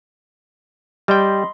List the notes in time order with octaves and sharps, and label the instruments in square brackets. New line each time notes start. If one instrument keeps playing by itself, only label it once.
[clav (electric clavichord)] G3 G5 [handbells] D#5 B5 C6